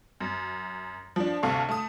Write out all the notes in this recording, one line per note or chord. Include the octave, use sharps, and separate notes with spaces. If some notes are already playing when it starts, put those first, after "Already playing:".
F#2
F3 D4
D2 C3 A4 F5 C#6
A3 A5 D#6